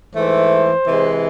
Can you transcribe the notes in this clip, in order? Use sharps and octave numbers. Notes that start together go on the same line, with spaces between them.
G#2 E3 A3 C5
C3 E3 G#3